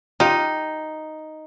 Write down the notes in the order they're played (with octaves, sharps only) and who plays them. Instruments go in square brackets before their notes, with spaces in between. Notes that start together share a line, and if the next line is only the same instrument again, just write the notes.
[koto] D#4 [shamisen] F4 G4 D#5